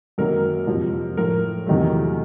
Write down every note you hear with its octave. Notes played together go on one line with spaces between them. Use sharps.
F#2 D#3 F#3 A#3 A#4
F2 C3 F3
A2 F3 A3 A#4
E2 C3 D#3 F#3 A3